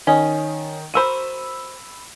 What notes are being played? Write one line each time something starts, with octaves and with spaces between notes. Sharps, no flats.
D#3 C#4 D#5
F#4 A#4 C5 B5 E6 D#7